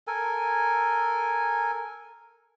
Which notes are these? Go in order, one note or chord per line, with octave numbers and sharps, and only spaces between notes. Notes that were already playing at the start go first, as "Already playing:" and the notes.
A4 A#4 G#5